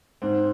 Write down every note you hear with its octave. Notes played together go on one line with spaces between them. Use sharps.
G#2 C4